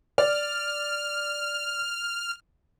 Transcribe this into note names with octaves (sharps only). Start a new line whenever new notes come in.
D5 F6